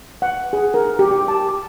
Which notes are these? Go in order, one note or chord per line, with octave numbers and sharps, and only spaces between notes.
F#5
G#4
A#4
G4
G4
A5
D6